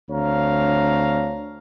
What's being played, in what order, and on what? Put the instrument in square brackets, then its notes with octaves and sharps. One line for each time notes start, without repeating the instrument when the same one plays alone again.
[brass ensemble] D2 C4 D4 C#5 F5 A#5